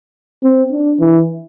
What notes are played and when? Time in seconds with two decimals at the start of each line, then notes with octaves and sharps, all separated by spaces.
0.43 C4
0.72 D4
1.00 E3